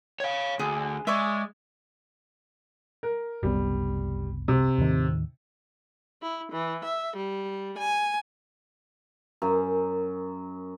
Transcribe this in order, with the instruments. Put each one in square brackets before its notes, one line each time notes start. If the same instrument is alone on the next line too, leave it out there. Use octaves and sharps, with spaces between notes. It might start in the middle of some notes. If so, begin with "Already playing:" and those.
[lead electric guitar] C#5 F5
[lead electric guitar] D2 [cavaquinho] G#4
[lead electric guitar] G#3 [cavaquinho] C#5 D5 E5
[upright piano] A#4
[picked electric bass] F#1 C2 B3 [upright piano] G3
[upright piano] C3
[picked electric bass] D#2 A2 D#3
[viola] E4
E3
E5
G3
G#5
[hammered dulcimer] F#2